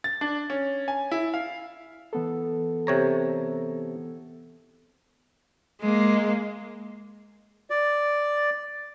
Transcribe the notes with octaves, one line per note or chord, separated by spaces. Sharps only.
A6
D4
C#4
G#5
E4
F5
E3 B3 A4
C3 C#5 A#5
G#3 A#3
D5